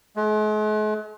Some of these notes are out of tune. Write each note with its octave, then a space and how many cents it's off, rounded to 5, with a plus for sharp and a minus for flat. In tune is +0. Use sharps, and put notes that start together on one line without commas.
G#3 +45